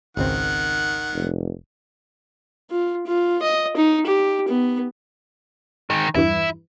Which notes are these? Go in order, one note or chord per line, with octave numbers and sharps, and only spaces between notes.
G#1 C#2 D#3 C4 F#5
F1
F4
F4
D#5
D#4
G4
B3
D#3 G#3
E2 G2 E3 E4